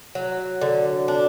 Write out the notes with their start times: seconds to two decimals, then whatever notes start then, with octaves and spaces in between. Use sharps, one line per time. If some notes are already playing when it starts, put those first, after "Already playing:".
0.15 F#3
0.61 D3
1.08 D4